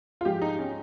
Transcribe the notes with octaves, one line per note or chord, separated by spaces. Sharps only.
F4
G#2 F3 G#3 G4
D#4
C#4